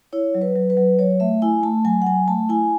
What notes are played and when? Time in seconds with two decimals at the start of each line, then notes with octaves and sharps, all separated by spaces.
0.13 E4 C#5
0.35 F#3
0.42 B4
0.56 F#3
0.70 B4
0.77 F#3
0.99 F#3 C#5
1.20 A3 E5
1.42 E4 G#5
1.63 A3 A5
1.85 F#3 G#5
2.02 F#5
2.07 F#3 G#5
2.28 A3 A5
2.49 E4 G#5